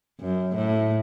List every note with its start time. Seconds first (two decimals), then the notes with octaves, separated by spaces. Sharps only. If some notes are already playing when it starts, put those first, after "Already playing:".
0.20 F#2
0.56 A2